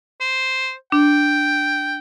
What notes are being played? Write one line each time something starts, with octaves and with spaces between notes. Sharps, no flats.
C5
D4 G5